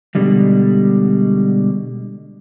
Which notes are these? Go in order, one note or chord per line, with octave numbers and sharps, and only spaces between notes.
B2 D3 G3 G#3